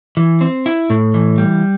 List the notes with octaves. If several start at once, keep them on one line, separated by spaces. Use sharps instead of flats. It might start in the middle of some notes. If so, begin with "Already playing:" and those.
E3
C4
E4
A2
E3
G3